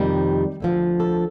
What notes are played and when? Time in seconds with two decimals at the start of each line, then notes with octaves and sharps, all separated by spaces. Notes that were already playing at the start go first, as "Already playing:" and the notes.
Already playing: F2 C3 D#3 G3
0.60 D2 D3 F3
1.00 A4